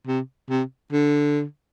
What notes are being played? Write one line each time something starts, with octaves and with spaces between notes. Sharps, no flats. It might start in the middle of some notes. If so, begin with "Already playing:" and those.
C3
C3
D3